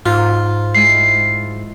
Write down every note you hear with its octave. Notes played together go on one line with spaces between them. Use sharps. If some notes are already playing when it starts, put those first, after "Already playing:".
G#2 F4
G#3 E4 C7